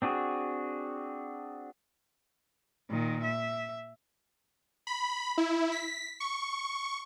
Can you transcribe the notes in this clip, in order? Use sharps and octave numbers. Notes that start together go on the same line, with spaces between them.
C4 D4 F#4 G#4
A#2 D#3
E5
B5
E4
B6
C#6